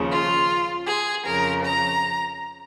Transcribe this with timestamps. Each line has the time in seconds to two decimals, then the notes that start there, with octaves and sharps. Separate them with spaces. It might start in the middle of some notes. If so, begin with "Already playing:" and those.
Already playing: D#2 C#3 F3
0.10 F4
0.87 G#4
1.25 F2 C#3 F3 A#4
1.64 A#5